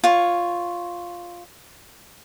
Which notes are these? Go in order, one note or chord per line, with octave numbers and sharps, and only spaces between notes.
F4 C#5